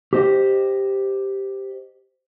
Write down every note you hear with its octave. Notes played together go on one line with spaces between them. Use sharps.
G4 C5 D#5